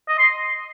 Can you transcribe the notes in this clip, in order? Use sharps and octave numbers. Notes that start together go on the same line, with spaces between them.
D#5
C6